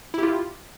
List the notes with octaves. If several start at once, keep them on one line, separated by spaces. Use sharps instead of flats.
E4 F4 G4